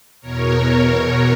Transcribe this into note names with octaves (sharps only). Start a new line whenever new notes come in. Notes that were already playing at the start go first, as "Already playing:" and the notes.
E2 B2 A#4 C#5